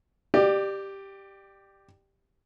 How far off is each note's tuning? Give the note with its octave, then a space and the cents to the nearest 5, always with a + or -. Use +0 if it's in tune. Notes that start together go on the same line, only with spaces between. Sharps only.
G4 +0 D5 +25